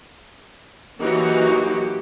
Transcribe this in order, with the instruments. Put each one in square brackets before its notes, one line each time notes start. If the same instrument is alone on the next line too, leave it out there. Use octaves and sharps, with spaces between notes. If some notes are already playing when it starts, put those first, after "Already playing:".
[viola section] E3 D#4 F#4 [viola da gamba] F#3 A#3 G4